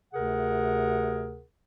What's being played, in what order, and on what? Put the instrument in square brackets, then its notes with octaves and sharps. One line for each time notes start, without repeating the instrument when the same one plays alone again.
[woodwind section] D2 C3 G#4 A#4 F#5